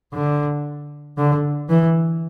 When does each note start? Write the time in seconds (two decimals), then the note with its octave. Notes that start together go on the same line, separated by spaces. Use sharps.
0.13 D3
1.18 D3
1.69 E3